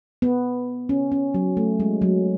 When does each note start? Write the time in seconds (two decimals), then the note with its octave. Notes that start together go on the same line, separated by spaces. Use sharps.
0.22 B3
0.89 C#4
1.12 C#4
1.34 F#3
1.57 A3
1.80 G#3
2.02 F#3